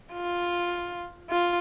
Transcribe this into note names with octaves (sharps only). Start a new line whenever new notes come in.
F4
F4